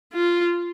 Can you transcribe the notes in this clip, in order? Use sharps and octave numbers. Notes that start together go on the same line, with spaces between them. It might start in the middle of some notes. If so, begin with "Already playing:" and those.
F4